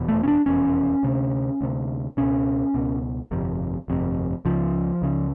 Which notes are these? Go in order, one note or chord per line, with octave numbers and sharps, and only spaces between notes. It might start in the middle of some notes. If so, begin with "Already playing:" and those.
Already playing: F1 E2 B2
A3
C#4
D4
F1 E2 B2 C#4
D2 C3
D2 C3
C#2 B2 C#4
C#2 B2
G1 F2 C3
G1 F2 C3
C#2 C#3 F3
C#2 C#3